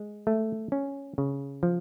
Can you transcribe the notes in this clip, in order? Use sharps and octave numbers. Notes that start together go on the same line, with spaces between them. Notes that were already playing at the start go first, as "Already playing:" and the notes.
Already playing: G#3
A3
C#4
C#3
F3